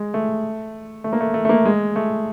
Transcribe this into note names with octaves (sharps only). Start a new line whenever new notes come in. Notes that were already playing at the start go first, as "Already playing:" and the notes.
Already playing: G#3
A3
A3
A#3
A3
A3
A3
A#3
G#3
A3